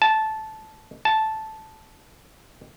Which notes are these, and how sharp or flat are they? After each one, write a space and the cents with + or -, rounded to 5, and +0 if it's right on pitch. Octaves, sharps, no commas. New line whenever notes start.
A5 -10
A5 -5